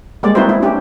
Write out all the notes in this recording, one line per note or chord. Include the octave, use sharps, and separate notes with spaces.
G3 G#3 A#3 D5
C4 D#4 E4 F#4 B4 C5
E4
C#4 D4 G4